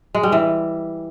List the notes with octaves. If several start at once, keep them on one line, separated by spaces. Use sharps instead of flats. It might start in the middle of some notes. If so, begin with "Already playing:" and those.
G#3
G3
E3